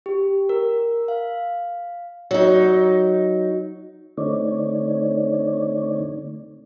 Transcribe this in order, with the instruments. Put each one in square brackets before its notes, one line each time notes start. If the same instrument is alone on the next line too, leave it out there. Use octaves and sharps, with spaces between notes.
[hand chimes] G4
A#4
F5
[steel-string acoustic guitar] F#3 D#4
[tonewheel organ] D3 A3 C4 D#4 C#5 D5